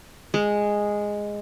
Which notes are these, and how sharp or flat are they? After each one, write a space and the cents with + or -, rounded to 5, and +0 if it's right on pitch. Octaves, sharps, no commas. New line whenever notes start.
G#3 -5